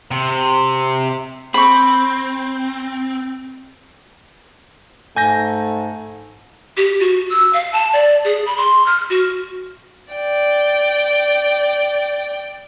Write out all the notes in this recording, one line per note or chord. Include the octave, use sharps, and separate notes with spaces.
C3
C4 B5 C#6
G#2 A3 G#5 G6 A#6
G4
F#4
E6
F5
A5
D5
G#4
B5
C6
F6
F#4
D5 G5